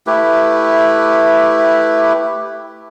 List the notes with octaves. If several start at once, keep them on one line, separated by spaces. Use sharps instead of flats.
A3 E4 G4 B4